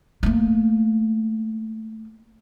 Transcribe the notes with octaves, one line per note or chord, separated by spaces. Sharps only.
A3 A#3